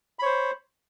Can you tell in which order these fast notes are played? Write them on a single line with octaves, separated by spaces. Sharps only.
B5 C#5 C5